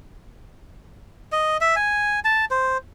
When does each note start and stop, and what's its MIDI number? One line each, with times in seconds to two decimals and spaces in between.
1.32 1.57 75
1.61 1.75 76
1.76 2.20 80
2.24 2.45 81
2.51 2.78 72